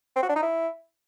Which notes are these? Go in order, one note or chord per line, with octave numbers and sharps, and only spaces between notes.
C4
F#4
D4
D#4
E4